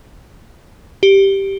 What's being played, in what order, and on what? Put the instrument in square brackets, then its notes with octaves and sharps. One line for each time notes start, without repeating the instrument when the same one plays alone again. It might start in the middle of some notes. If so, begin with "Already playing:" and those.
[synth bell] G4